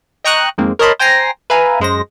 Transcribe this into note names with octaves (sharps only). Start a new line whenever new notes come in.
D#5 G5 A#5 C#6 D#6 F#6
F2 D#3 G#3 A#3 C4
A#4 C#5 D#5 A5 B5 C6
C5 G5 G#5 A#5 A#6 C7
B4 E5 F5 G#5 A#5
F#2 G#3 C5 A#6